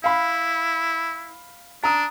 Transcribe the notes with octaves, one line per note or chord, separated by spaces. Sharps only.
E4 F5 B5
D4 A#5 D#6